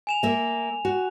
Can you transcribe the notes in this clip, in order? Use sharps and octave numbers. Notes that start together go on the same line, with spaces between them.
G#5 E7 F7
A#3 E5
F#4